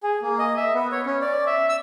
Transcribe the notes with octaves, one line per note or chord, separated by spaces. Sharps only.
G#4
A#3
D#5
E5
B3
C#5
C#4
D5
E5
E6